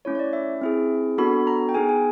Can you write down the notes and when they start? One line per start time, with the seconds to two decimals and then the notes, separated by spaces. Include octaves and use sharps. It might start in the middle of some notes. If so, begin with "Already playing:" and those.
0.05 A3 C#4 E4 C#5
0.15 C#5
0.19 D5
0.33 E5
0.61 C4 E4 G#4
1.18 B3 D4 F#4 A4 B5
1.47 A#5
1.69 G5
1.74 B3 D#4 G#4 G#5
1.89 G#5